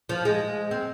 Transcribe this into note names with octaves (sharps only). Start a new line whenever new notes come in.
F3
G#3
C4